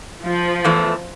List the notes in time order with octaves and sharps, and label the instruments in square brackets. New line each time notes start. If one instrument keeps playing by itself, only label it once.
[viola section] F3
[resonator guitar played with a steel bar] E2 E3 A3